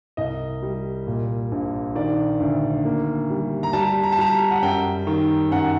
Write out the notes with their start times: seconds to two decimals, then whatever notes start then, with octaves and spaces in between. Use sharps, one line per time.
0.17 C2 D#5
0.62 G3
1.07 A#2
1.52 A#1
1.95 D#3 D5
2.40 D2
2.85 A#3
3.30 G3
3.63 A#5
3.73 G3 A5
4.03 A#5
4.12 A5
4.18 G3 A#5
4.51 F#5
4.63 F#2 G5
5.07 D#3
5.51 F#2 F#5